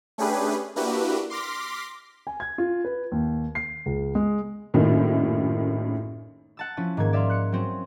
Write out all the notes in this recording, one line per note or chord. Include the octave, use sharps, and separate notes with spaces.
A3 C#4 D4 G4 G#4 B4
A#3 D4 E4 F#4 G4 B4
C6 D6 F6 A#6 B6
G#5
G#6
F4
B4
D#2
C7
C#2
G#3
A#1 F#2 A2 D#3
F#5 A5 E6
F3 C#4 E4
G#2 D#3 A#3 G#6
D5 E5 F5 C6
F#6 C#7
F#3 C4 C#4